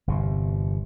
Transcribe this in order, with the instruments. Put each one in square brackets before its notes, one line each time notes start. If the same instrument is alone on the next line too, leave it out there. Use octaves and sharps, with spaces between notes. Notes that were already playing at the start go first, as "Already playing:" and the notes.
[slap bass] G1 E2 C3